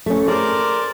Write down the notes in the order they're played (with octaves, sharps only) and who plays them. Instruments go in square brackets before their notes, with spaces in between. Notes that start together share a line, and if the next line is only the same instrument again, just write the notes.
[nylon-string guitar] A3 C#4
[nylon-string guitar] G#4 [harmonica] A#4 C5 D5